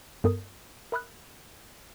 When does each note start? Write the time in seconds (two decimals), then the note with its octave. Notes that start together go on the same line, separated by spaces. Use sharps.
0.24 G2 B3 A4 A#4 D#6
0.92 A#4 E5 B5 D#6 F6 F#6